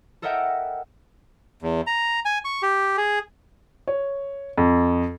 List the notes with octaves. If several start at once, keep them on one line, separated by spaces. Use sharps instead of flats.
A4 A#4 D#5 E5 F#5 G5
E2
A#5
G#5
C#6
G4
G#4
C#5
F2